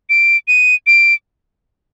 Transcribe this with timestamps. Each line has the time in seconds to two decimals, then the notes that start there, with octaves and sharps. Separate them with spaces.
0.09 D7
0.48 D#7
0.87 D7